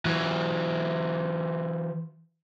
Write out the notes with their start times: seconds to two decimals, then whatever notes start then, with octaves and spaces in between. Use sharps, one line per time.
0.05 E3 F#3